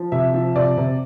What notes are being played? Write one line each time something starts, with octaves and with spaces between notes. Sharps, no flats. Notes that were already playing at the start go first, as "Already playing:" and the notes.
Already playing: F3
C3 E5
F3
C3 D5
C3